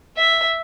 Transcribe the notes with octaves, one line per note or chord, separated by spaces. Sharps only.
E5